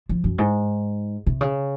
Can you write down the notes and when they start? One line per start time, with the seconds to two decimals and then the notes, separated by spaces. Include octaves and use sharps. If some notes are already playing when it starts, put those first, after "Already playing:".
0.09 F3
0.24 F#2
0.38 G#2
1.27 C3
1.41 C#3